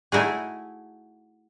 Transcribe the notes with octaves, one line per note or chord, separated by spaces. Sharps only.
A3 D#4 E4 F#4 G#4